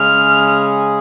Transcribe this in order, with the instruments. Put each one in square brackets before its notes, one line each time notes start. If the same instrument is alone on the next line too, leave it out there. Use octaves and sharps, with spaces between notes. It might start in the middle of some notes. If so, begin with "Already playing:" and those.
Already playing: [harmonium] C#3 G#3 C#4 G#4 [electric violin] F6